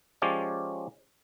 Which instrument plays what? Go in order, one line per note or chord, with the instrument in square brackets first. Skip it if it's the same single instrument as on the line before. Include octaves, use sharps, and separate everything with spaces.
[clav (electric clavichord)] F3 G#3 C#4 G4 C#5 D5